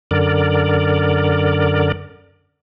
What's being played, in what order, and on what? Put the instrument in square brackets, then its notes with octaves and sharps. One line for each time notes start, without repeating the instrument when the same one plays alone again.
[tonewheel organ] F#2 D3 A#4 D5